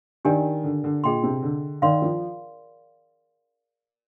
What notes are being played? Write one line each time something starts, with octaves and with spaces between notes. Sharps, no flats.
D#3 D4 G4 A#4 D5 G#5
D3
D3
A#2 G#4 D#5 G5 C6
C3
D3
D#3 A#4 D5 F5 C6
F3